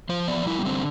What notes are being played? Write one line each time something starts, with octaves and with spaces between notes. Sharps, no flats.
F3 C5
B3 D5
G3 E4
B3
D3 C4